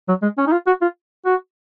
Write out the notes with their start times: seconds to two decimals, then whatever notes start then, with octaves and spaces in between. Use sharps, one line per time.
0.09 F#3
0.22 G#3
0.38 C#4
0.47 D#4
0.52 F4
0.67 F#4
0.82 F4
1.26 F#4